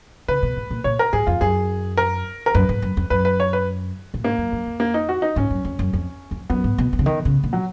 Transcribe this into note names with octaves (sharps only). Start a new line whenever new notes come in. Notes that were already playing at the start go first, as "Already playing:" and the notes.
C#3 B4
B2
G#2
A#2
A#2 C#5
A#4
G#2 G#4
F2 F4
F#2 G#4
A#4
A#4
F#2 B4
G#2
F#2
F2
F#2 B4
B4
C#5
B4
A#2
G#2 A#3
F#2
F#2
F2
A#3
D#4
F#4
D#4
G#2 C#4
F#2
F2
F#2
F2
F2
F#2 B3
G#2
B2
D#3
C#3
D#3
C#3
A#2
F#3